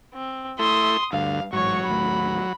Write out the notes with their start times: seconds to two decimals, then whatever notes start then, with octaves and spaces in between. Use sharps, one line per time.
0.14 C4
0.59 A3 E4 C6 D#6
1.13 D2 G2 F5
1.53 A1 G#2 F#3 C#5 C#6
1.86 A1 D#2 A3 B5